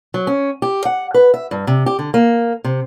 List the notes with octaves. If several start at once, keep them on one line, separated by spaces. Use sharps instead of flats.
F#3
C#4
G4
F#5
B4
E5
G2
C3
G4
D3
A#3
C3